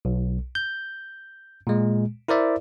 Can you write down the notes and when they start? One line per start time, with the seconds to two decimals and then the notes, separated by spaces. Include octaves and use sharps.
0.05 B1
0.55 G6
1.67 A#2 G#3
2.28 E4 A#4 C5 D5 E5